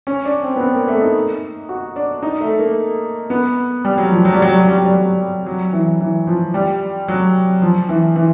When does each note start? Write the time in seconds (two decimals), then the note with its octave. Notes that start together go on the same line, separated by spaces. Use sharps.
0.07 C#4
0.25 D4
0.43 C4
0.56 B3
0.61 C4
0.75 A#3
0.88 A3
1.01 D#4
1.69 F#4
1.96 D4
2.23 D#4
2.41 A3
2.59 A#3
3.30 B3
3.85 G3
3.98 F#3
4.12 F3
4.25 F#3
4.33 G3
4.42 F#3
4.51 G3
4.60 F#3
4.68 G3
4.77 F#3
4.85 G3
4.94 F#3
5.46 F#3
5.73 E3
6.00 E3
6.27 F3
6.54 G3
7.08 F#3
7.62 F3
7.89 E3
8.16 E3